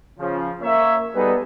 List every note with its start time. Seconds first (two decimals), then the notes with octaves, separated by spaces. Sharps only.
0.19 C#3 F3
0.62 A#3 C#5 E5
1.15 G3 B3 D#4 G#4 A4 B4